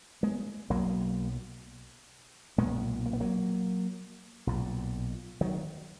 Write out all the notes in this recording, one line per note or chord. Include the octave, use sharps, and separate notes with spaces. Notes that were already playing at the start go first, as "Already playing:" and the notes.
G#3 B3
B1 B2 F#3 A#3
B1 A#2 G#3 B3
A#3
B3
F#3 A#3
B1 A#2
D#3 F#3